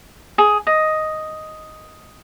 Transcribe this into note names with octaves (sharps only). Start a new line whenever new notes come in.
G#4
D#5